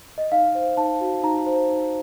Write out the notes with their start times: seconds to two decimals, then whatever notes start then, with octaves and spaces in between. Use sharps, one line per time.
0.18 D#5
0.32 D#4 F5
0.55 C5
0.77 D#4 A5
1.01 F#4
1.23 D#4 A#5
1.46 C5
1.70 D#4